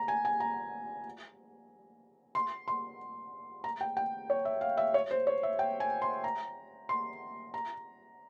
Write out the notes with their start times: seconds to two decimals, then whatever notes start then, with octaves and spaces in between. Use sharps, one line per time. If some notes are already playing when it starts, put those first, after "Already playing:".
Already playing: A#5
0.08 G#5
0.25 G#5
0.40 A#5
2.35 C6
2.68 C6
3.64 A#5
3.81 G5
3.97 G5
4.30 C#5
4.45 E5
4.61 F5
4.77 E5
4.94 C#5
5.11 C5
5.27 C#5
5.43 E5
5.59 G5
5.80 G#5
6.02 C6
6.24 A#5
6.89 C6
7.54 A#5